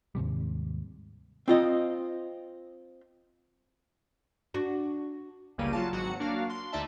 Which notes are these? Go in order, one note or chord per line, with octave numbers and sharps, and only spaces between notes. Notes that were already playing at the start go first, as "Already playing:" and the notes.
D#2 G#2 C3 G3
C4 F4 D#5
D4 F#4
G1 C#2 C#3 G3 A#3 D#7
F#3 F4 A5
G#1 F#3 F#4 C#7
A#3 D4 F#4 F5
C6
D2 D#4 D5 E5 A5